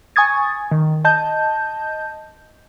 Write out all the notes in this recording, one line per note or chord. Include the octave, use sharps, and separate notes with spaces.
G#5 C#6 D#6 G#6 A6
D#3
D#5 A5 G6